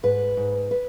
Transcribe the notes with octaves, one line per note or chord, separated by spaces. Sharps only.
G#2 B4
G#2
B4